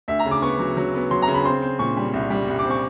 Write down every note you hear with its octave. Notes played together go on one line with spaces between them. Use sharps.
D2 E5
A#5
C#3
D6
B3 C#6
F#3
F#3
B3
F#3 C6
A#5
C#3
B5
C4 C6
C4
A#2 C#6
G3
C2
G3
C2
D6
C4
C#6